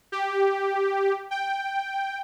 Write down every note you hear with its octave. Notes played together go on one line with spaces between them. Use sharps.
G4
G5